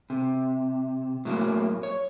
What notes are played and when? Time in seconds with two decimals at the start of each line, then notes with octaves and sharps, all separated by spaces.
0.10 C3
1.25 A2 F#3 G#3 A#3
1.83 C#5